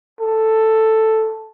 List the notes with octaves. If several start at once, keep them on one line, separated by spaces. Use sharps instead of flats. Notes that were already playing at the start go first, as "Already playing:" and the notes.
A4